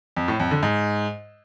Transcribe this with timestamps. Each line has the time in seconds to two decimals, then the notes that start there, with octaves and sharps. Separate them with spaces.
0.17 F2
0.28 A2
0.40 F2
0.51 D3
0.63 G#2